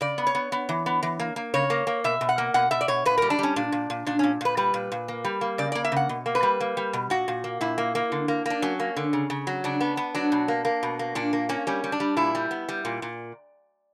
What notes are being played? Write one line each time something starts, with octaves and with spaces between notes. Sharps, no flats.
C#3 D5
B3
C#5
B3
B3
E3
B3
E3
A#3
A#3
C#3 C#5
A#3
A#3
B2 E5
B2
F#5
A#3
B2 F#5
B2 E5
D5
B2 C#5
A#2 B4
G3 A#4
D4
G3 C#4
A#2 D4
A#2
A#2
A#2 D4
A#2 C#4
A#2 B4
G3 B4
A#2
A#2
A#3
G3
A#3
C#3 D5
A#3 D5
E5
C#3 F#5
B2
A#3
B4
G3
A#3
G3
B2
A#2 F#4
A#2
A#3
A#2 E4
A#3
A#3
D3
A#3
A#3 D4
F#3 C#4
A#3
D3
C#3
C#3
F#3
C#3 D4
B3
B3
F#3 D4
B2
A#3
A#3
B2
A#3
A#2 D4
A#3
A#3 C#4
G3 C#4
G3
D4
G3
A#2 E4
G3
B3
G3
A#2
A#2